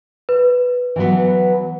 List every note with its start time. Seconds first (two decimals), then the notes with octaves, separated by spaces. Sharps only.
0.29 B4
0.96 E3 F#3 B3